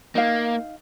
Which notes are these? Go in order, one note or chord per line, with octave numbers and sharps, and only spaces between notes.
A#3 D#4 F5